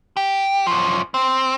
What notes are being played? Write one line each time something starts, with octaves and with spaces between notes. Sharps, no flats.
G4
F#2 F3
C4